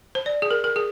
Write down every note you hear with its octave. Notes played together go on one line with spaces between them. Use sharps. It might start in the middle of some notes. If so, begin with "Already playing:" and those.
C5
D5
G#4
A#4
A#4
G#4